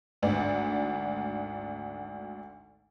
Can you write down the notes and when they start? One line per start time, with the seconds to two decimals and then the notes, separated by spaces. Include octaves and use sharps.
0.22 G#1 D2 D4